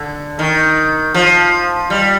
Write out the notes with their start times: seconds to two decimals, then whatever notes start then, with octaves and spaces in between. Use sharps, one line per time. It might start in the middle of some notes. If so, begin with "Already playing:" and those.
Already playing: D3
0.39 D#3
1.14 F3
1.90 G3